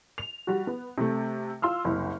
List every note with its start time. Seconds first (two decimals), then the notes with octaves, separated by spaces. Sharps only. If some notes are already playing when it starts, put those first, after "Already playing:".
0.18 F7
0.47 G3 F#4
0.67 B3
0.98 C3 A3
1.62 F4 C6 E6 F6
1.85 F#1 C2